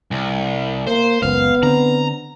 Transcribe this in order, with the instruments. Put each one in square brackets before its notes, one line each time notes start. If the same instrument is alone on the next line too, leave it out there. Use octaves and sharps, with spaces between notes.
[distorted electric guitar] C2
[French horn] A#3 [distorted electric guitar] C5
[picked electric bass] F#1 C#2 [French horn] B3 [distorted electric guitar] F5
[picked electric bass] D3 C4 [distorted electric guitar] A#5